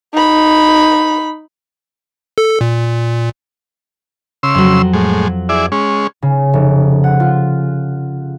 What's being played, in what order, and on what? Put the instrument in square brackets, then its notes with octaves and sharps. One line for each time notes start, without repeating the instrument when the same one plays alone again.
[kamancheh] D#4 B5
[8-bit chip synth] A4
A#2
[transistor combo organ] C#3 C6 E6
[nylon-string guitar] F2 F#3
[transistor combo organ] A2 G#3
E4 G#4 D5
G#3 C#4
[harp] C#3
F1
F#5
F4